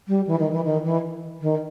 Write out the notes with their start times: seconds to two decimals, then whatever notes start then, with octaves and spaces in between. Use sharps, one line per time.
0.08 G3
0.27 E3
0.40 D#3
0.52 E3
0.65 D#3
0.84 E3
1.41 D#3